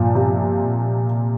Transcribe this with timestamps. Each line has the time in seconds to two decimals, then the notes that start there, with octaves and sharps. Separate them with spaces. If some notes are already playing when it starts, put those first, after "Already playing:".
Already playing: G2 A#2 F3
0.15 C3
0.64 A#2